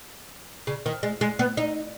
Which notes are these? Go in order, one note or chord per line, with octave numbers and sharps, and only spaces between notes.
C#3
D#3
G#3
G#3
B3
D#4